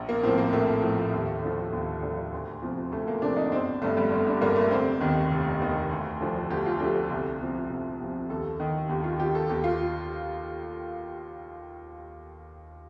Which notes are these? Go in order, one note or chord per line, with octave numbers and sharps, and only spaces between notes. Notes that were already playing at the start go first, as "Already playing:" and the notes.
Already playing: A#1
A#3
A2 F3 C4
A#3
A#1 A3
A2 F3
D#2
D3 F3
D#2
D3 F3
D2
C3 F3
D2 A3
A#3
C3 F3 D4
D#4
G1 C4
G2 D3 A3
G3
G1 A3
D4
G2 D3 A#3
A3
F1 C4
D#2 D#3
F1
D#2 D#3
D2
D3 F3
D2 G4
F4
D3 F3 G4
A4
C2
C3 F3
C2
C3 F3
D#2 A4
D#3
D#2 G4
F4
D#3 G4
A4
D#2 G4
F4